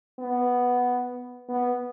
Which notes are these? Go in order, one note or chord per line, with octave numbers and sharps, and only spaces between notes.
B3
B3